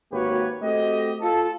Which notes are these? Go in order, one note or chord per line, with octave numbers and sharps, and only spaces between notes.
G#1 A#3 F#4 G4 B4 C#5
A3 C4 F#4 G4 D#5
F4 A4